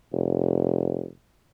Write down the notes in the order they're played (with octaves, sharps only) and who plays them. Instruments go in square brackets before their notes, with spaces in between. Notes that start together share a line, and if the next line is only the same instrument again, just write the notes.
[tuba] F1